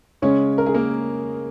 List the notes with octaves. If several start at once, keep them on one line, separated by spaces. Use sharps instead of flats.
C#3 G#3 C#4 C#5
A#4
G#4
A#3 A#4